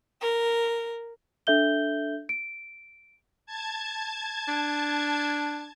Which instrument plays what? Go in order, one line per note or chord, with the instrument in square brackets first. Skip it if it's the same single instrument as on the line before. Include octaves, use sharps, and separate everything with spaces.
[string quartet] A#4
[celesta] D4 A4 E5 G6 G7
D7
[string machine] A5 G#6
[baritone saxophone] D4